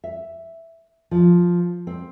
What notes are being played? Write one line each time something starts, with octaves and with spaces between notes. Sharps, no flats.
E5
F3
C4